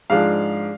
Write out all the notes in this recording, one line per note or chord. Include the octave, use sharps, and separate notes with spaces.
G#2 F3 G#3 D4 F5